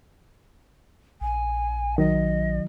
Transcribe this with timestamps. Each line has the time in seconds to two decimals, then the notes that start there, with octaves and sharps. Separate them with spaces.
1.21 A#1 G#5
1.98 D#3 F#3 D#5